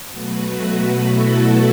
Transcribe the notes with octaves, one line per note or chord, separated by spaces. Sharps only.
B2 F#3 A3 F#4 B4
F#4 B4
E4 A4